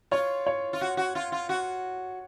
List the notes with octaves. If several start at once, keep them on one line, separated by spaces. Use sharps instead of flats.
F4 C#5
C#5
F4
F#4
F#4
F4
F4
F#4